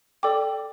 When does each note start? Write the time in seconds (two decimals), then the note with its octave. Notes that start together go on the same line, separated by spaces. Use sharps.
0.23 A4 D5 G5 D6